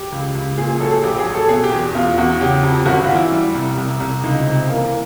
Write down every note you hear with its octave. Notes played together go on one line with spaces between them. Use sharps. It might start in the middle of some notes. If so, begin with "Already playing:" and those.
Already playing: G4
C#2
C#2
A#2 G#4
G#4
F#3 A4
G#4
A#1 G4
G#4
F#3
A4
B2 G#4
G4
E2
E2 F4
E2 F#4
C#3 G4
F2
G1 F#4
F4
E3
E4
G3
C2
C2
C2
C#2 D#4
C3
E3 A#3
A#3